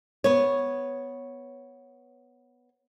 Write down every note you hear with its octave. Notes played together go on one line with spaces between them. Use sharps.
B3 C#5